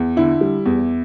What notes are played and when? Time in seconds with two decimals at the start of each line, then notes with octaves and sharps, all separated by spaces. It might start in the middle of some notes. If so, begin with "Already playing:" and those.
Already playing: E2
0.16 D3 E4
0.41 G3
0.66 E2